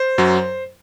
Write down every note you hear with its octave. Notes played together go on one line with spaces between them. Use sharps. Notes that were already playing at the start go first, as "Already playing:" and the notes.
Already playing: C5
F#2 F#3